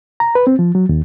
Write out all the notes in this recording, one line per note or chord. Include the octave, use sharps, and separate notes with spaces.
A#5
B4
C4
F3
F#3
D#2